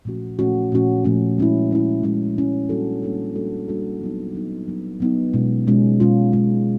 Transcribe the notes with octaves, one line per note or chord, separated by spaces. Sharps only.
A#2 F3 A3 C#4 F#4
A#2 F3 A3 C#4 F#4
A#2 F3 A3 C#4 F#4
A#2 F3 A3 C#4 F#4
G#3 C#4 E4
G#3 C#4 E4
G#3 C#4 E4
G#3 C#4 E4
G3 A#3 D4 F#4 A4
G3 A#3 D4 F#4 A4
G3 A#3 D4 F#4 A4
G3 A#3 D4 F#4 A4
F#3 B3 D#4
F#3 B3 D#4
F#3 B3 D#4
F#3 B3 D#4
B2 G#3 C#4 F4
B2 G#3 C#4 F4
B2 G#3 C#4 F4
B2 G#3 C#4 F4